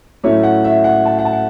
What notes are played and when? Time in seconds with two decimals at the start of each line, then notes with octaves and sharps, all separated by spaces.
0.24 A2 F#3 A3 C#4 E4 C#5
0.43 F#5
0.64 E5
0.84 F#5
1.05 A5
1.19 F#5
1.25 A5
1.33 F#5